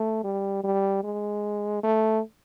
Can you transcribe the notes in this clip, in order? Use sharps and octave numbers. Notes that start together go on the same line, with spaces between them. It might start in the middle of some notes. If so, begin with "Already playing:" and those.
Already playing: A3
G3
G3
G#3
A3